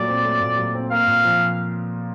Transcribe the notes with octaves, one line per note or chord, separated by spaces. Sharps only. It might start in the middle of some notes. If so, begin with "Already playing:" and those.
Already playing: A#2 F#3 A3 D5
C4
A3
A#2
F#3
C4
A#3 F5
A#2
F3